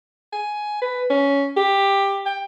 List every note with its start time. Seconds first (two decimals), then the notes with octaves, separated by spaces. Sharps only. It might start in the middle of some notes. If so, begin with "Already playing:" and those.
0.33 G#5
0.82 B4
1.10 C#4
1.57 G4
2.26 G5